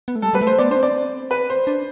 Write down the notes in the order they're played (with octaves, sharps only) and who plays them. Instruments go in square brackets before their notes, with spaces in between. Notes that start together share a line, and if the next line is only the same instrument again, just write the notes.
[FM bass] B3
A3
[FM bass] G3 [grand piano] A4
[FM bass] G3 [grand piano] B4
[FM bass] A3
[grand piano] C5
[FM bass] B3 [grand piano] D5
[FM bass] D4 [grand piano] C5
[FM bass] C4
[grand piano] D5
B4
C5
[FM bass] D4